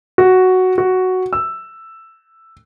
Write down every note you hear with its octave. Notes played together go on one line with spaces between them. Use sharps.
F#4
F#4
E6